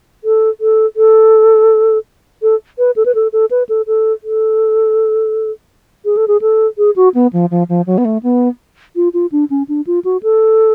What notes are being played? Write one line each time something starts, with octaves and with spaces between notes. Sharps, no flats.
A4
A4
A4
A4
B4
A4
B4
A4
A4
B4
A4
A4
A4
G#4
A4
G#4
A4
G#4
F#4
B3
F3
F3
F3
F#3
B3
A3
B3
F4
F4
D4
C#4
D4
F4
F#4
A4